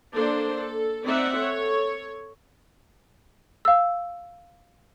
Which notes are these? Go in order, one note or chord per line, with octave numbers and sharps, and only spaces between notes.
A#3 D4 A4 C5
A4
C4 D#4 D5 E5 F#5
A4 C#5
F5 E6